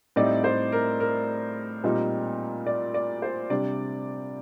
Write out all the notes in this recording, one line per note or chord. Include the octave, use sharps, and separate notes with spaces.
A2 G3 C4 D#4 D5
C5
A#4
A#4
A#2 G3 C4 D#4
D5
D5
C5
C3 G3 D4 D5